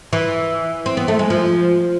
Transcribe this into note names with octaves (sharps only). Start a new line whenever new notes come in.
E3
C4
B3
A3
G#3
F3